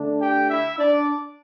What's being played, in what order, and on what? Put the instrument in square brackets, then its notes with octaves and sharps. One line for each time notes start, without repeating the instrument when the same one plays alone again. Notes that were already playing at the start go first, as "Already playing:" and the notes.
Already playing: [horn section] D3 A3 D4
G4 G5
E4 E5
D4 D5